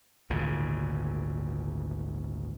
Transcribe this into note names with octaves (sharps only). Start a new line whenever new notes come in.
G#1 D2 A#2 C#3